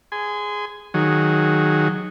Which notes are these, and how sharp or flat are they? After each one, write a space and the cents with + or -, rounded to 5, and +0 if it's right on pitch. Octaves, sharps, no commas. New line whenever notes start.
G#4 +0 G#5 +0 C6 -30
D#3 -10 F#3 -5 G#4 +0